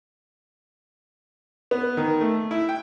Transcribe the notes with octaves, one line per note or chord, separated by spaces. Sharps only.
B3
D#3
A3
E4
G5